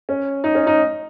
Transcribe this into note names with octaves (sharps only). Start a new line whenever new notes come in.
C#4
D#4
C#4
D#4